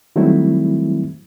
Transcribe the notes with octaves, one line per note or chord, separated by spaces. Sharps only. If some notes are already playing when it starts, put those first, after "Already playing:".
D#3 F#3 G3 A3 C4 E4